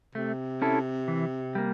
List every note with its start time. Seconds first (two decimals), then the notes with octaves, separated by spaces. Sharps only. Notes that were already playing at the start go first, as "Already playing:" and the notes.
0.15 C3 A3
0.62 C#4 E4 A4
1.08 E3
1.55 G3 A#3